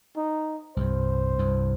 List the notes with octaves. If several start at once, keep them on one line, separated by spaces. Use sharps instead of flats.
D#4
C2 G2 C5
C2 G2